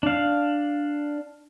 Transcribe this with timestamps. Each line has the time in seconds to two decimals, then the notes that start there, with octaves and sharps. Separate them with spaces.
0.03 D4 F5